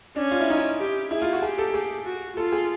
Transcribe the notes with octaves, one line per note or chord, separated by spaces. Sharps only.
C#4 D4
F4
E4
D#4
E4
G4
E4 G#4
F4
F#4
G4 G#4
A4
G#4
F#4
F4 A4
G#4